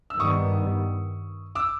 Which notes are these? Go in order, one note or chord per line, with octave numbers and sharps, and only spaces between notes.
E6
G2 D#3 G3 B3 C#6 D#6
D6 E6